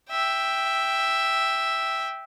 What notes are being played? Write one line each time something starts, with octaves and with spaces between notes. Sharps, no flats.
E5 G5